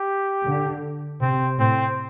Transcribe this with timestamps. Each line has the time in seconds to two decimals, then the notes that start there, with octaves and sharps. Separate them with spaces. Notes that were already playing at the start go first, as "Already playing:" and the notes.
Already playing: G4
0.45 D3
1.21 C3 C4
1.59 A2 C4